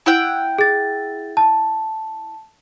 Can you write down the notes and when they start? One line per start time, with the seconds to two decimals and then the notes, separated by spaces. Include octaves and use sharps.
0.06 E4 F#5 G5
0.59 G#4 A6
1.37 A5